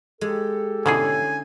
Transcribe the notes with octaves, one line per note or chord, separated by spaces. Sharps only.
G#3 G4 A4
G#2 B2 D3 C#4 E4 G#4 G#5